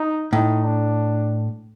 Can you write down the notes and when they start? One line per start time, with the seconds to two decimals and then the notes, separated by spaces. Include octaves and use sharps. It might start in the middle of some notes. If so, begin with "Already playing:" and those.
Already playing: D#4
0.33 A2 D#4
0.64 D4